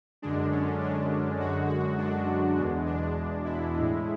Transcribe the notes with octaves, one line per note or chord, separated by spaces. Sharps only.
F#2 D3 G#3 D4
C#4
D4
F#2 D3 G#3 F#4
F#4
D4
E2 B2 G#3
D4
E4
A2 G#3